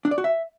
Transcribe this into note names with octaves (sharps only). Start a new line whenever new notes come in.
D4
D5
F#4
E5